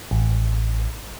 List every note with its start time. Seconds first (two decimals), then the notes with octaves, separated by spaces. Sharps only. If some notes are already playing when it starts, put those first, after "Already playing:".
0.11 A1